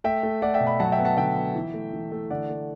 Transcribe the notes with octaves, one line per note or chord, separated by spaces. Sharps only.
A3 E5 G5
A3
A3 D5 F#5
E5 G5
B2
G5 B5
F#3 F#5 A5
E5 G5
B3
F#5 A5
D3 E5 G5
B3
E3
A3
E3
A3
D3 D5 F#5
A3